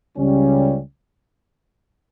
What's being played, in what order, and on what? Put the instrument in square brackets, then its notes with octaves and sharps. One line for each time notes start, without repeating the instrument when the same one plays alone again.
[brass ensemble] C#2 C#3 G3 C#4